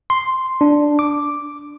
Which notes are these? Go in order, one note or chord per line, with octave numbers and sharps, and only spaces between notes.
C6
D4
D6